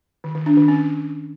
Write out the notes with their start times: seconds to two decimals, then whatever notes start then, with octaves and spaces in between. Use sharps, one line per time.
0.24 D#3
0.35 D#3
0.46 D4
0.57 D#3
0.68 C#4